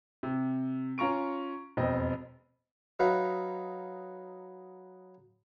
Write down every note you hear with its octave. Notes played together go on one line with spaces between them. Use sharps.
C3
C#4 F4 A#5 C#6 D7
E1 F2 C4 D#5
F#3 D#4 B4 E5 F5